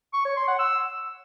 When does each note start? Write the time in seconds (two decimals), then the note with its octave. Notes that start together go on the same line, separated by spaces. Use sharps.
0.14 C#6
0.25 C#5
0.36 C6
0.48 F#5
0.59 E6